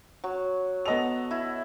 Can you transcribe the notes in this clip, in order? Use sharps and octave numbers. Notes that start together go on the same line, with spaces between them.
F#3
B3 A4 D#5 F7
E4